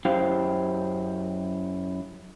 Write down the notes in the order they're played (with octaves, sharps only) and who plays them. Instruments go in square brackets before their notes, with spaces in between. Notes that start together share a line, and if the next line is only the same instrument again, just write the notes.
[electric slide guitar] F#2 E4 G4 C5 F5 G5